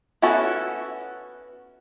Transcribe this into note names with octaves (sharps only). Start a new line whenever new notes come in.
B3 C#4 E4 F#4 A4